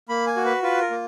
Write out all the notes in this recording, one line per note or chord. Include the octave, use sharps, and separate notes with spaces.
A#3 B5
G#5
F#4
B4
F4 B4
A#4
A#3